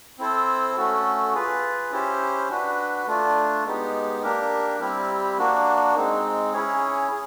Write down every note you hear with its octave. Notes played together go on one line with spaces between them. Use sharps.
C4 E4 A4 C5
A3 C#4 F#4 A4
F4 G#4 B4
C#4 E4 G4 C5
D4 F#4 B4
A3 D4 F4
G#3 B3 D#4 G4
A#3 D4 G4 A#4
G3 C4 E4 G4
A#3 D4 F#4
G#3 C4 D#4
C#4 E4 G#4 C#5
G#4